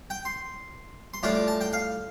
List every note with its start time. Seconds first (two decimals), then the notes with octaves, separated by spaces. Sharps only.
0.10 G5
0.25 C6
1.14 C6
1.23 A2 G3 D4 F4 D6
1.35 D6
1.48 A5
1.61 G5
1.73 F5